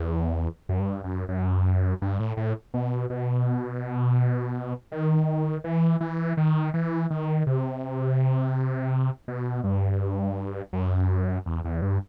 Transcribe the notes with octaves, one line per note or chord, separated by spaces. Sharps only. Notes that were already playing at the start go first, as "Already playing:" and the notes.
Already playing: E2
F#2
G2
F#2
F#2
G2
A2
A2
B2
B2
D#3
E3
E3
D#3
E3
D#3
C3
B2
G2
F#2
E2
E2
G2